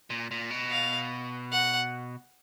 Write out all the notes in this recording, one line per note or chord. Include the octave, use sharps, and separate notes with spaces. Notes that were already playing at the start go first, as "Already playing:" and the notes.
A#2
A#2
B2
F5
F#5